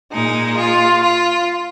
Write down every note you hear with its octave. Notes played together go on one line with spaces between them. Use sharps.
A#2 G#3 D#4
F4
F4